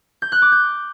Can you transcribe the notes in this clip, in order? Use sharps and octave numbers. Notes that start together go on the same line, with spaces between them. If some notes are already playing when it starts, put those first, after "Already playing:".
G6
F#6
D6
G6